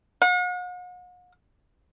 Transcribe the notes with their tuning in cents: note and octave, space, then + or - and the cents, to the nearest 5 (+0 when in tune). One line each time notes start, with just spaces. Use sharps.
F#5 -45